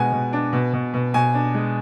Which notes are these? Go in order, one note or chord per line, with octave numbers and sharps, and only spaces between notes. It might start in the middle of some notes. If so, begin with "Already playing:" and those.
Already playing: B2 G#3 F#5 G#5
B2
D4
B2
B2
B2
B2 G#5
D4
G#3